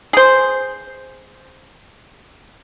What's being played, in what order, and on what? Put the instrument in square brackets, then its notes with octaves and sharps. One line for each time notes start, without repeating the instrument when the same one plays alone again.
[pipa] G#4 C5